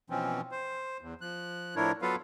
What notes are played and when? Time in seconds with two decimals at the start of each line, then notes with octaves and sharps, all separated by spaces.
0.10 B2 E3 F3 C4 C#4
0.52 C5
1.01 E2
1.21 F3 F#6
1.76 A2 F3 D4 E4 A#4 C#5
2.02 F#3 B3 F4 A4 B4 F5